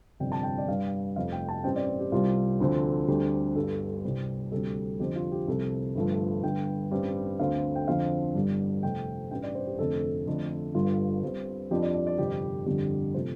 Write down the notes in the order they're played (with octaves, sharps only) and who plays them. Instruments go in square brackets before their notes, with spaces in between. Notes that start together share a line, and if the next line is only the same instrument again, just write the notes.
[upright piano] G1 F2 C3 G3 D4 G5
A5
G5
D5
G2 G3 D4 F5
F1 F2 C3 A3 F5
G5
A5
A1 G2 G3 C4 G5
D5
G4
C2 C3 G3 C4 F4
D2 D3 F3 C4
D2 D3 G3 C4 G4
G1 G2 G3 A4
C2 C3 G3 C4
D2 C3 G3 A4
F2 D3 F3 C4 G4
F4
G4
C2 C3 F3 C4 A4
G1 G2 F3 A3
G1 G2 D3 G5
A1 G2 G3 C4
D2 D3 A3 C4 F5
G5
F2 D3 F3 C4 F5
G1 G2 G3 D4
F2 C3 A3 C4 G5
A1 G2 G3 G5
D5
C5
G4
F1 F2 D3 A3 C4 A4
F2 D3 A3 D4
G1 G2 G3 F4
G2 G3 C4
F2 F3 D4 G4
D5
D5
D5
G1 F2 C3 G4
G1 F2 D3 G3 G4
C3 F3 A3 C5